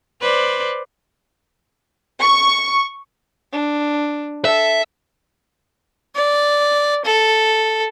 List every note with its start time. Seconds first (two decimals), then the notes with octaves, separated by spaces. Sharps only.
0.21 B4 C5 D5
2.20 C#6
3.53 D4
4.45 A4 E5
6.16 D5
7.05 A4